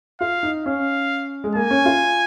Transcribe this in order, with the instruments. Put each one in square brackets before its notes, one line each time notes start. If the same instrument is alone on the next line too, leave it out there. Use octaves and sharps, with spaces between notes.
[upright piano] F4 [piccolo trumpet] F5
[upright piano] D#4
[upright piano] C#4 [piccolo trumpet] F5
[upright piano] G#3
[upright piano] A#3 [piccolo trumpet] G#5
[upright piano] C#4
F4